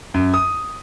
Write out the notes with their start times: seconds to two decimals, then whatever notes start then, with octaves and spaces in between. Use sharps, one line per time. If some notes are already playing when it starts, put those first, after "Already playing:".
0.14 F#2
0.34 D#6